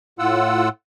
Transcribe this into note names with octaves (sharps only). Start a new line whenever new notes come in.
A2 F4 F#5 E6